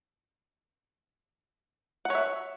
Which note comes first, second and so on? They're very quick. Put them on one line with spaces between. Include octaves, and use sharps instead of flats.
F#5 C#5 E5